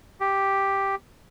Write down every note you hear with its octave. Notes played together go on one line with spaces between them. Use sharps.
G4